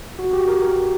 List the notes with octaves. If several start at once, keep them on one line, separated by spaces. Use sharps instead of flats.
F#4
G4
A#4